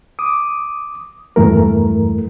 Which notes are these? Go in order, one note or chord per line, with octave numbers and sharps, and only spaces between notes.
D6 D#6
E2 G2 E3 A3 A#4